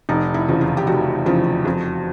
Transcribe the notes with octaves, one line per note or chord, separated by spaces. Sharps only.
F1 D#4
E4
E2 C#3 F3
F4
G4
F1 F#4
E2 C#3 F3
F2